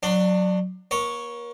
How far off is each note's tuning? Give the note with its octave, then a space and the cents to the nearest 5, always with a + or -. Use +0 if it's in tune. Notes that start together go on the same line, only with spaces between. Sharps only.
F#3 -5 D4 +25
A#3 +35 C#5 +0